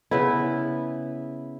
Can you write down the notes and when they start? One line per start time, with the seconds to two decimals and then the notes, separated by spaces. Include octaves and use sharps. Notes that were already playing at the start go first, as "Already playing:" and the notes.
0.11 C#3 B3 E4